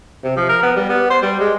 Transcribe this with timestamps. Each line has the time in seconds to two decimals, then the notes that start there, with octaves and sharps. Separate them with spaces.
0.24 C3
0.36 F3
0.49 A#4
0.62 B3
0.76 G3
0.89 B3
1.10 C5
1.22 G3
1.40 G#3